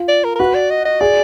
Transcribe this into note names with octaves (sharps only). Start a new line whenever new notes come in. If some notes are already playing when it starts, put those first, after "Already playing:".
Already playing: F4
D5
A#4
A#4
F#4 B4
D5
D#5
D#5
G#4 D5